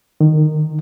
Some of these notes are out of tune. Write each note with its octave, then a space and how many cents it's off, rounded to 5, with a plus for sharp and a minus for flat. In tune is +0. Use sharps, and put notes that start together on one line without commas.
D#3 -20